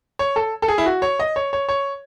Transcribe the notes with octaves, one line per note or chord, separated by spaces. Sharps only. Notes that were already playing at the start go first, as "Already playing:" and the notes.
C#5
A4
A4
G#4
E4
F#4
C#5
D#5
C#5
C#5
C#5